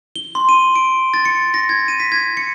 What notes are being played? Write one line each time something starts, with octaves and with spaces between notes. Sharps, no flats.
G7
C6
D#7
D7
A6
C#7
A#6
G#6
D#7
B6
G#6
C#7